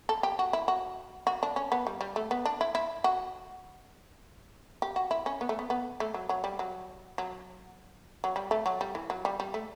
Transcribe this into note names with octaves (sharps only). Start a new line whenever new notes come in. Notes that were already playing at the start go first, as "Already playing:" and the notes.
A4
G4
F#4
E4
F#4
F#4
D4
C#4
B3
G3
G3
A3
B3
D4
E4
E4
F#4
G4
F#4
E4
C#4
B3
A3
B3
B3
A3
F#3
F#3
G3
F#3
F#3
F#3
G3
A3
F#3
G3
E3
F#3
G3
G3
A3